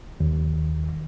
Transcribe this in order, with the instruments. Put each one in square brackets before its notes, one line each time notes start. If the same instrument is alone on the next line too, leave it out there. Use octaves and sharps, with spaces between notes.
[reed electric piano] D#2